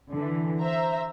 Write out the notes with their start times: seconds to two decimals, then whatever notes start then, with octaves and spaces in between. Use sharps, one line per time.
0.11 D3 E3
0.60 C5 E5 A#5